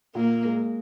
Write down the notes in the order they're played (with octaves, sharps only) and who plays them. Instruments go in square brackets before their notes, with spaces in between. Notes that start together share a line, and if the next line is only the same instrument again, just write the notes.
[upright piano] A#2 [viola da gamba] A#3
[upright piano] G#3